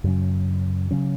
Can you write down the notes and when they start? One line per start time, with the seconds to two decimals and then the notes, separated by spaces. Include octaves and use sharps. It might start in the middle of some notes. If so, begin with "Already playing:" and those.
0.04 F#2 C#3 F#3 C#4
0.91 C#3 F#3 C#4